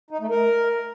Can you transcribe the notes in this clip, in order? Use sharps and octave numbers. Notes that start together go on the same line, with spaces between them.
D#4
A3
A#4